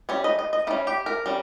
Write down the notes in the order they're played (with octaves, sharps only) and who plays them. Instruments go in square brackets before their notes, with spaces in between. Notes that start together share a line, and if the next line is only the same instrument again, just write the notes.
[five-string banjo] G3 C#4 C#5
D#5
D#5
D#5
G3 E4
C#4
G4
A#4
G3 C#4